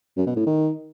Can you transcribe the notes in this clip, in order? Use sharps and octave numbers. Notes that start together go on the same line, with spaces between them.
F#2
B2
A2
D#3